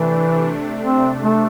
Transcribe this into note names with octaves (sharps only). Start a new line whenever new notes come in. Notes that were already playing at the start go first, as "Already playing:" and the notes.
Already playing: C3 E3 A3 D4
C4
A3